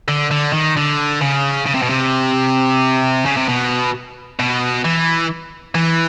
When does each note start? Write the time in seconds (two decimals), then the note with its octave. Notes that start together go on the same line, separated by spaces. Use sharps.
0.08 D3
0.31 D3
0.53 D#3
0.77 D3
1.22 C#3
1.66 C#3
1.75 C3
1.82 B2
1.89 C3
3.26 C#3
3.37 C3
3.49 B2
4.39 B2
4.85 E3
5.75 E3